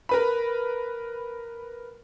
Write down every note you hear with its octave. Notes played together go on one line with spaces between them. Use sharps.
A#4 B4 B5